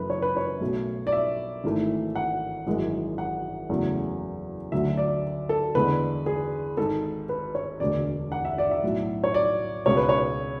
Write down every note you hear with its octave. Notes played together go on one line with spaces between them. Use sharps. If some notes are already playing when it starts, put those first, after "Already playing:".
Already playing: F#1 F#2 E3 A3 B4
C#5
B4
C#5
B1 B2 A3
D5
E5
G#1 G#2 E3 A3
F#5
G#1 F#2 E3 G#3
F#5
F#1 E2 C#3 F#3 A3
D2 D3 F#3 A3 E5
D5
A4
E2 D3 G#3 B4
G#4
G#1 G#2 G#3 A4
B4
C#5
E1 D2 D3 G#3 D5
F#5
E5
D5
E5
B1 A2 F#3
C#5
D5
C#2 B2 G#3 C#5
B4
C#5